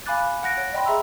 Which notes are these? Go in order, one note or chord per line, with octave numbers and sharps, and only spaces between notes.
F5 G#5 B5 D6 F#6 A6
F#5 F#6 A#6 D7
C#5
D5 D#5 G5 B5 C6
G#4 E5 A#5 C6 E6